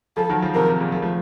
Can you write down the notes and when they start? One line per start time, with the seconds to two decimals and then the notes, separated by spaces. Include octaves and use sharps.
0.16 C#3 F3 A4
0.29 D#3 F#3
0.42 C#3 F3
0.55 C3 A#4
0.68 C3
0.80 A#2 C#3
0.92 C#3 F3
1.02 F3 A3